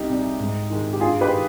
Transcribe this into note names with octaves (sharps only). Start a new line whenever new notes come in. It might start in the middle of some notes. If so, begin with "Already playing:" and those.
Already playing: C2 D#4 G4
C3 G3
G#2
D#3 G#3
G4
G2 F4 G#4
G4 B4
D#3